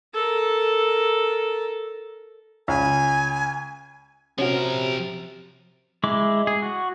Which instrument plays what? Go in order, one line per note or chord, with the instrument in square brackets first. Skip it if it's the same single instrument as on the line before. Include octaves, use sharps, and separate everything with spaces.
[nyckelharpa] A4 A#4
[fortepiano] C#2 [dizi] G#5
[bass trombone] C3 [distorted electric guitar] F3 A#4 [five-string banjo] C#4 F#4
[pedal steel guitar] G#3 E4 D6
G#4
F#4